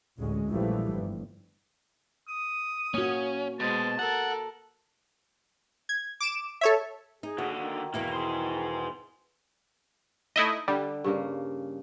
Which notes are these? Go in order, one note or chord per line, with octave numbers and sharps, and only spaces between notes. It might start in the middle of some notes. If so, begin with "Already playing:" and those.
A1 D2 G#3 C#4
A#1 E3 F3 G3 A3
G1
D#6
A#3 C#4 F#4
B2 G#3 C5 A5
A4 A#4 F#5
G#6
D6 D7 E7
A4 C#5 E5
D#4 G#4
D#2 D3 F#4
D#3
E2 B2 A#3 E4
G#4 C5
A3 D#4 E4 D#5
D3 G3
G2 C#3 A#3